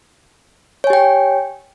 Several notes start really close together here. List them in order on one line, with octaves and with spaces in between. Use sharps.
C#5 G#5 G4 G5